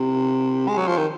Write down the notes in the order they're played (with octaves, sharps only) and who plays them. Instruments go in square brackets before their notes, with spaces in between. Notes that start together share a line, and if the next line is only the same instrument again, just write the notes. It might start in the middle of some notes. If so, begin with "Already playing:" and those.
Already playing: [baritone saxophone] C3
G#3
F#3
F3
D#3